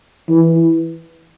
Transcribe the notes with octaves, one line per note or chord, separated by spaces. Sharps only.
E3